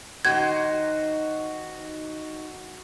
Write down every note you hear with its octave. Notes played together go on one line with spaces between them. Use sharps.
D#3 D#4 F#4 C5 G#6